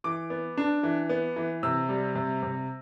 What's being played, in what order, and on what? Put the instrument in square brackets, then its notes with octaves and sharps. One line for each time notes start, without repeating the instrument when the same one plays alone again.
[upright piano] E3 D6
B3
D4
E3
B3
E3
C3 E6
G3
C3
C3